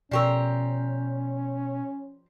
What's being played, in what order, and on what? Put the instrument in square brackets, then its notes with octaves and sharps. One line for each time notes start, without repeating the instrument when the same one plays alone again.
[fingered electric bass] B2 [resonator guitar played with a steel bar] F3 G4 A#4 [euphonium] C#4 [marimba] D5 C#6 E6